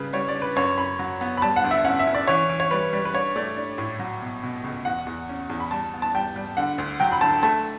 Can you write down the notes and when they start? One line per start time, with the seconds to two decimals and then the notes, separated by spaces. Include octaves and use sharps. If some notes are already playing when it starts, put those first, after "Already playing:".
Already playing: C#3 G3 B4
0.13 G3 C#5
0.28 D5
0.35 D4
0.42 B4
0.56 F#2 C#5
0.78 F#2 B5
0.99 F#3
1.21 B3
1.37 B5
1.42 G3 A5
1.56 F#5
1.64 D2
1.71 E5
1.85 C#4 F#5
1.99 E5
2.07 C#4
2.14 D5
2.28 E3 C#5
2.49 E3
2.60 C#5
2.71 G3 B4
2.93 G3
3.05 B4
3.14 D4 C#5
3.36 A3 D5
3.57 D4
3.78 A2
3.99 F#3
4.22 B2
4.43 B2
4.64 C#2
4.85 E2 F#5
5.06 E2
5.29 C#4
5.50 E2
5.60 B5
5.71 G3 A5
5.94 B3
6.02 A5
6.15 G3 G5
6.36 G3
6.57 D3 F#5
6.78 D2
7.00 F#3 G5
7.12 B5
7.21 D3 A5
7.43 A3 A5